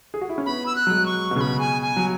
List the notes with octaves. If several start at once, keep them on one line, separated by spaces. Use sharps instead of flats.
G#4
F#4
E4
C#4
B3 B5
E6
F#6
F#3
G#3
C#6
B2
C#3 B5 C#6
G#5
G#5
F#3